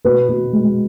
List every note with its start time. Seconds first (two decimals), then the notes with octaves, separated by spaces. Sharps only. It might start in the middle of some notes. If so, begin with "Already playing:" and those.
0.05 B2 B4
0.29 B2
0.53 G#3